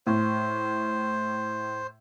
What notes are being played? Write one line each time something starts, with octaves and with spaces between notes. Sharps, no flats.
A2 C5